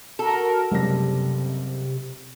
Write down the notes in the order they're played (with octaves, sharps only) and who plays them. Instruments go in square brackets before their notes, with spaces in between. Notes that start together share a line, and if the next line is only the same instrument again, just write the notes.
[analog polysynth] F#4 A#4 [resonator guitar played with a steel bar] A4
[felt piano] F#1 G3 A#6 [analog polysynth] C3